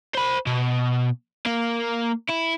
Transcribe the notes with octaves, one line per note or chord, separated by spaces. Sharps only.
C5 B5
B2
A#3
E4